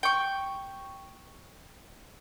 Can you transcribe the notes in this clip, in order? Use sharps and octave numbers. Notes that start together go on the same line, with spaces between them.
G5 C#6